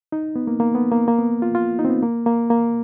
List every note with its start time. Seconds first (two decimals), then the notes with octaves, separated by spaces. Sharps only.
0.12 D#4
0.36 B3
0.47 A#3
0.60 A#3
0.75 B3
0.92 A#3
1.08 A#3
1.19 B3
1.42 F4
1.55 F4
1.79 D#4
1.85 C4
1.90 B3
2.03 A#3
2.26 A#3
2.50 A#3